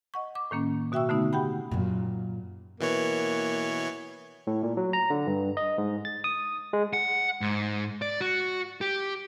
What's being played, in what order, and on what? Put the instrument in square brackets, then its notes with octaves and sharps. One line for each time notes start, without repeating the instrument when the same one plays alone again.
[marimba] D#5 F#5 C#6
D6
A2 D#3 A#3 C#4
B2 F#4 E5 G5 C#6 E6
D3 A3 B3 D#4
F#4 G4 F#5 G5 B5
[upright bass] F#2 A#2
[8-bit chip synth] B2 E3 C#5 [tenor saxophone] A#3
[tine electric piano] A2
A#2
F#3
A#5
D3
G2
D#5
G#2
A6
D#6
G#3
[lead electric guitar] F#5
G#2
D5
F#4
G4